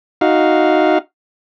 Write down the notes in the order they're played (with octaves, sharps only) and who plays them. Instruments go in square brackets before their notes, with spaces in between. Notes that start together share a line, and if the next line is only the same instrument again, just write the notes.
[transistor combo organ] D#4 F#4 F5